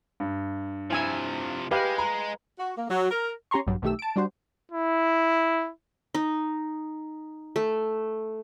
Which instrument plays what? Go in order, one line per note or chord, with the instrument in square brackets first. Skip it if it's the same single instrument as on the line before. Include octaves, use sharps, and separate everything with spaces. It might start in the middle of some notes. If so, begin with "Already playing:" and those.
[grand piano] G2
[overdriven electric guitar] C3 F3 [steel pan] E4 G#5 E6
[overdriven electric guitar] G#3 [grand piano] G4 [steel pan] B4 F5
[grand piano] A#5
[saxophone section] F#4
A#3
F#3
A#4
[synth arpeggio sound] C#4 G4 A#5 C6 C#6
A#1 G2 F#3
B1 D#3 A3 G4 E6
A5 D7
G3 D4 F#4 C5
[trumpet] E4
[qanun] D#4
A3